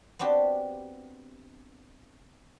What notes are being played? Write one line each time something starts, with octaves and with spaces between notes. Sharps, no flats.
B3 C4 D4 F#4 G4